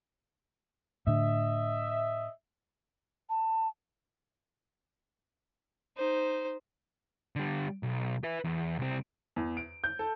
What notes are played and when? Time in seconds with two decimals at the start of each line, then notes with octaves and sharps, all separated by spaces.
1.07 A2 D3 D#5 E5
3.30 A5
5.97 D#4 C5
7.36 D3 G3
7.83 B1
8.24 B4 E5
8.44 E2
8.79 C2 C4
9.36 E2
9.57 D7
9.84 G6
9.99 A4